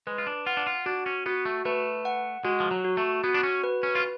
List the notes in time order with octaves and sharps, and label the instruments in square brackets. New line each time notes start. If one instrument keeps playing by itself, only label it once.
[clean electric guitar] G#3 [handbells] B4
[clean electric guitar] F4
D4
[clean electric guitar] F4 [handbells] F#5
[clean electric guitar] D4
F4
[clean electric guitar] D4 [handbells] F#4
[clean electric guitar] C#4
[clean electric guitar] B3 [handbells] F#4
[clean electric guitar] A3
[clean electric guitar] A3 [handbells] B4
[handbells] F#5
[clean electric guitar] G#3 [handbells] F#4
[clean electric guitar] F3
F#3
[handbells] F#4
[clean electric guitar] A3
[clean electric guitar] B3 [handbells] F#4
[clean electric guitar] D4
C#4
[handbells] B4
[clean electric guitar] C#4
F4